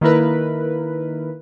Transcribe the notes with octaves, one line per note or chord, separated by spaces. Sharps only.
D#3 A#3 E4 A#4 B4